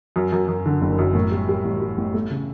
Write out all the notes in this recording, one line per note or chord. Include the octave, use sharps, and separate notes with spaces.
F#2
F#2
F#2
D3
F#1
F#2
A2
G3
G3
A1
G3
A1
A3
C#3